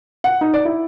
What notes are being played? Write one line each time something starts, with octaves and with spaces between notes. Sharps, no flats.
F#5
D#4
D5
E4